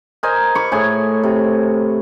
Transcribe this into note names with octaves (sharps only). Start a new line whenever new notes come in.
A#4 C5 D#5 G#5
B5 C#6 D6
A2 G#4 G#5 C#6
C3